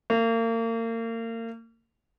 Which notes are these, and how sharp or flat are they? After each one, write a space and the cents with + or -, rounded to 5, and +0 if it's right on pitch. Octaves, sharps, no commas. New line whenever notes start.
A#3 -35